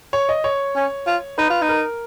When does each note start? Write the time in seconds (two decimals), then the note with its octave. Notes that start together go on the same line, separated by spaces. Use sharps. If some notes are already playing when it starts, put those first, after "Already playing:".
0.13 C#5
0.29 D#5
0.44 C#5
0.76 C#4
1.07 F4
1.38 D#4 B4
1.50 F4
1.62 D#4
1.69 A#4